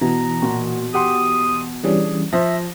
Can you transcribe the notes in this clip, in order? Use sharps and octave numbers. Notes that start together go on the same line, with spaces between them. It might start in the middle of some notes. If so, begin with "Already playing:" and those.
B2 E3 A#5
A#2 F#4
G4 F#5 C6 D#6
E3 G3 C#4 D4 G#4
F3 C5 E5 A#6